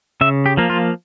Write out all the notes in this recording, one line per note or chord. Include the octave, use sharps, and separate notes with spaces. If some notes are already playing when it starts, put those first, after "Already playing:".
C#3 E5
G4
F3 A#3
F4